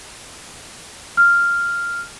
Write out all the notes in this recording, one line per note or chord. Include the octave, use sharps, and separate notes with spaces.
F6